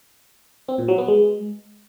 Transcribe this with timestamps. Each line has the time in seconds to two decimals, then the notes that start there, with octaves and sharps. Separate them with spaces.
0.68 C4
0.78 A#2
0.88 F#3
0.98 B3
1.08 G#3